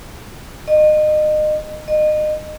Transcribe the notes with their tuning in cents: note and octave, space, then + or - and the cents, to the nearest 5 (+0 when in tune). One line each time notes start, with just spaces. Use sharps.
D#5 -30
D#5 -30